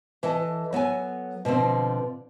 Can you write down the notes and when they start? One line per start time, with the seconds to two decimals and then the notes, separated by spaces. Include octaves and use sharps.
0.23 E3 A4 D#5 A5
0.73 F#3 B3 A4 G#5
1.45 B2 D3 F3 C4